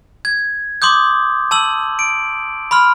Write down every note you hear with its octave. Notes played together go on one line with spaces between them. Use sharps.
G#6
C6 D6 D#6 G6
A5 E6 F#7
D7
B5 C6 F6